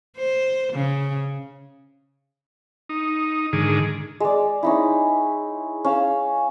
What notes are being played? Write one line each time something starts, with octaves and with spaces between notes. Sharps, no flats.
C5
C#3
D#4
G#2 D3 D#3 G#4
G#3 D5
C#4 D#4 E4
C#4 F5 E6